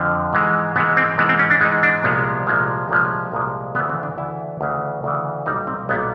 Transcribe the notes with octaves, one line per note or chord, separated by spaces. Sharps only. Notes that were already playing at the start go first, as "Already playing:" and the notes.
Already playing: F2 D3 F3
G#2 E3 G#3
G#2 E3 G#3 B3
C4
G#2 E3 G#3 B3
C4
C#4
D4
G#2 E3 G#3 D#4
D4
C2 A#2 F3 G#3 B3
C2 A#2 F3 G#3
C2 A#2 F3 G#3 C#4
C2 A#2 F3 G#3
D2 C#3 E3 B3
C4
D4
D2 C#3 E3 E4
D2 C#3 E3
D2 C#3 E3
B1 A#2 G3 D#4
C4
B1 A#2 G3 B3